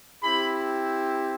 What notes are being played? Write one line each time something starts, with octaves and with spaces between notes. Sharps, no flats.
C4 E4 G4 B5